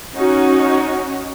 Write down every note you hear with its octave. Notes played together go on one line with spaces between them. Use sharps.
C#4 D#4 F#4